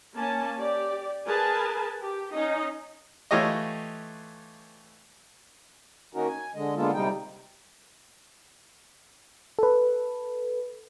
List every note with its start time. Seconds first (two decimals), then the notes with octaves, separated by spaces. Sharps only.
0.16 A#3 C#4 G#5 A5
0.58 G4 D5
1.26 G#4 A#4 B4 G#5 A5
2.01 G4
2.32 C#4 D#4 D#5
3.31 E3 A3 F4 G4 C#5 D#5
6.13 D#3 A#3 C#4 D#4 F#4 A#4
6.28 G#5
6.55 D3 G#3 D#5
6.76 D3 G#3 A#3 B3 F4 A4
6.94 C3 G3 D#4 G5
9.59 A4 B4